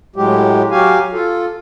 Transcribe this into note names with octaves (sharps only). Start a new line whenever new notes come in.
A2 F#3 G#3 G4
F#3 F#4 G4 F5 G#5
F4 A4